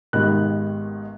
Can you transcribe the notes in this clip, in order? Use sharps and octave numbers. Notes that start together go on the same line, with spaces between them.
G#1 G#2 D#3 G3 B3 F#6